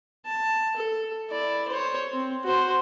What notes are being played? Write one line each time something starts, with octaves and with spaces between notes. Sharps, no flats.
A5
A4
E4 D5
C5 C#5
C4
F#4 C5